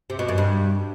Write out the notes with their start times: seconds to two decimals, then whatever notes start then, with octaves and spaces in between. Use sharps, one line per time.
0.10 C3
0.19 B2
0.28 F#2
0.38 G2